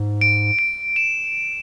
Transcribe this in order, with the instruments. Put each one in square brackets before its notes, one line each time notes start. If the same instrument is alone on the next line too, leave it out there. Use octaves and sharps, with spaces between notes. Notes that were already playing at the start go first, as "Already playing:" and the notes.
Already playing: [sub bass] G#2
[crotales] D7
D7
E7